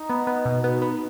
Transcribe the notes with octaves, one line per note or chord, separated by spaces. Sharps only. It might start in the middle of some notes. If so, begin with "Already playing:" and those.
Already playing: D#4
B3
B3
B2
B3
B3